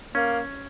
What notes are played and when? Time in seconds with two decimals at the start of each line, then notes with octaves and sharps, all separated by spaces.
0.15 A#3 C#4